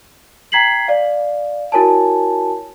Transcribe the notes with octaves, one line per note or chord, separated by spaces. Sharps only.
G5 A#5 G#6 B6 C7 F#7
D5 F5
E4 F#4 A#4 C#5 G#5 A5